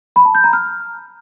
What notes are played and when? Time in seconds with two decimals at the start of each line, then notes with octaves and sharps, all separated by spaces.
0.16 B5
0.25 A5
0.35 G6
0.44 A#5
0.53 F6